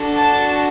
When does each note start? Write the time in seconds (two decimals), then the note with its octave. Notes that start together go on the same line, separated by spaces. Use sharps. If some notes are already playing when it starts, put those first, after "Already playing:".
Already playing: D4 F#4 A4
0.15 A5